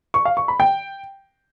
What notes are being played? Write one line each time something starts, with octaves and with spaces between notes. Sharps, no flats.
C#6
F5
C#6
B5
G5